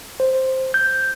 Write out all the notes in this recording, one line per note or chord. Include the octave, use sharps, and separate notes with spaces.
C5
G6